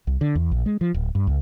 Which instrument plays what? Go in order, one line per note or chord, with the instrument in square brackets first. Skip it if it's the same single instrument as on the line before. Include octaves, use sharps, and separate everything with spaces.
[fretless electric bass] C2
D3
E2
A#1
G#3
F3
D1
G2
C#2